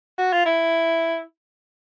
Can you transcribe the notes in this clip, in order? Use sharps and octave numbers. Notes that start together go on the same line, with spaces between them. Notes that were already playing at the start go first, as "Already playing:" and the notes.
F#4
F4
E4